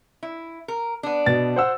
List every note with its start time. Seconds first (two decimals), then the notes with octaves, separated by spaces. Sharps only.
0.23 E4
0.68 A#4
1.03 B3 D4
1.26 B2 A6
1.56 C5 F#5 E6